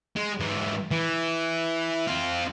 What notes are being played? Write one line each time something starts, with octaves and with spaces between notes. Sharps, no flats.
G#3
G#2 E3
E3
C4 F4